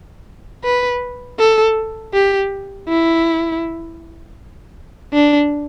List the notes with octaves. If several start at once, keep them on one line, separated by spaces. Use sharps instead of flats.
B4
A4
G4
E4
D4